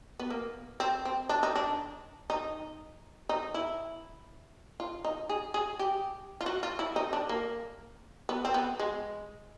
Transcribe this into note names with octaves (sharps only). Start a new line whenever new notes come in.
B3
A#3
C4
C4
D4
D#4
D4
D#4
D#4
E4
F4
D#4
G#4
G#4
G4
F4
F#4
F4
E4
D#4
D4
A#3
B3
C4
B3
G#3